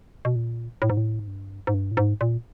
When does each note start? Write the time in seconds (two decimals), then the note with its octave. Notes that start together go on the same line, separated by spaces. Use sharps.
0.25 B2
0.36 A#2
0.82 A2
0.90 G#2
0.97 A2
1.19 G#2
1.28 G2
1.67 G#2
1.74 G2
1.91 A2
1.97 G#2
2.21 A#2